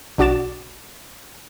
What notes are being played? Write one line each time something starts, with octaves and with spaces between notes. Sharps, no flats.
B1 D4 F#4 D6 A6 E7